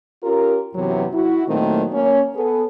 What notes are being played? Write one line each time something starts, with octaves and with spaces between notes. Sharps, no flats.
C#4 F4 G4 A#4
F#2 C3 E3 F#3 B3 F#4
E4 F#4
A#2 D#3 F#3 A3 A#3 C4
A#3 C#4 C#5
B3 G#4 A4